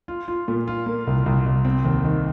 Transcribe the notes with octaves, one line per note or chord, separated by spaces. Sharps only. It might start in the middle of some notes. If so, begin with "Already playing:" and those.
F4
F4
A#2
F4
A#3
C2
C2
C2
C4
D#2
D#3